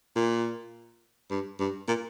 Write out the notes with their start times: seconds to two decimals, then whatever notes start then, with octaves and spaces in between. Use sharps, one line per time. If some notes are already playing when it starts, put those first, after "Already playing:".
0.16 A#2
1.31 G2
1.60 G2
1.88 A#2